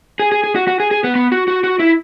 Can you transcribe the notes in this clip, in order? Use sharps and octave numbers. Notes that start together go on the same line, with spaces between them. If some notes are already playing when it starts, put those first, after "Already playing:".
G#4
G#4
G#4
F#4
F#4
G#4
G#4
B3
B3
F#4
F#4
F#4
E4